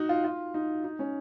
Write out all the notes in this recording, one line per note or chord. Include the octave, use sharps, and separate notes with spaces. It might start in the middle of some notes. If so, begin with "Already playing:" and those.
Already playing: D#4 F#4
F4
F4
D#4
D#4
C#4